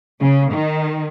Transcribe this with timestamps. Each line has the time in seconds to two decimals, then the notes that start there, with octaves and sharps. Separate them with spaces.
0.21 C#3
0.52 D#3